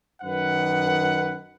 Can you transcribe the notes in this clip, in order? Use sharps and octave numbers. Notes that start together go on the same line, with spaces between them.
F#2 D#3 B4 F#5